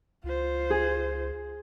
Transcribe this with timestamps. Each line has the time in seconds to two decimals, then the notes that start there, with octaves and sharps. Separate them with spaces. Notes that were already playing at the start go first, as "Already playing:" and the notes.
0.24 C#2 F4 C5
0.70 G#4